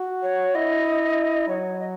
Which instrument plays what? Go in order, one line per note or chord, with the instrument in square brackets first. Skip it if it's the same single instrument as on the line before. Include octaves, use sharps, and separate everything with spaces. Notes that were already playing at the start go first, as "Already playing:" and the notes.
Already playing: [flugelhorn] F#4
[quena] C#5
[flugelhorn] E4 [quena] D#5
[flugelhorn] F#3 [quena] C#5
[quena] D#5